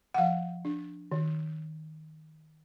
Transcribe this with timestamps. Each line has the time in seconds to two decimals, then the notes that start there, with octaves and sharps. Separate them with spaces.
0.14 F#5
0.18 F3 F5
0.65 D4
1.12 D#3